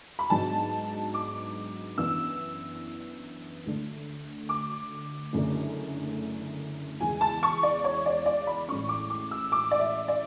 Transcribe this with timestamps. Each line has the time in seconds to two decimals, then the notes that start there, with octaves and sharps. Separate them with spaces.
0.19 B5
0.30 G#2 F#3 B3 D4 A5
1.14 D6
1.97 F#2 E3 B3 D4 E6
3.66 D2 D3 A3 D4
4.49 D6
5.33 F#1 F#2 D3 A3 D4
7.00 E2 C#3 G#3 G#5
7.21 A5
7.43 C#6
7.63 D5
7.84 C#5
8.06 D5
8.26 D5
8.47 B5
8.68 A1 A2 G#3 C#4 C#6
8.89 D6
9.10 D6
9.31 E6
9.52 D6
9.71 D5
9.80 E5
10.08 D5